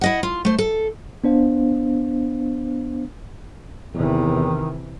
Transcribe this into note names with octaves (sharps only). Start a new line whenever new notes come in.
E4 D#5 F#5
F4
A3 C5
A4
B3 D4 C5 F5
E2 C3 D#3 E3